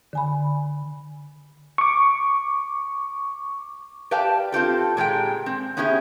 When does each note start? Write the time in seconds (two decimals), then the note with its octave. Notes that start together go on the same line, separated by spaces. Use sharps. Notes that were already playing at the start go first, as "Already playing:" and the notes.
0.13 D3 G#5 B5
1.78 C#6 D6
4.11 G4 B4 D5 F5 G5 A5
4.52 C4 F4 G4 A4
4.97 A#2 G#3 G4 G5
5.46 C4
5.77 B3 C#4 E4 G4 G#4